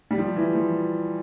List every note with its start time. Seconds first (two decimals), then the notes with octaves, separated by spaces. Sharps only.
0.11 G3
0.18 F3
0.36 E3
0.55 F3